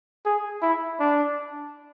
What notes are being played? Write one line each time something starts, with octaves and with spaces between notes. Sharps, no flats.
G#4
E4
D4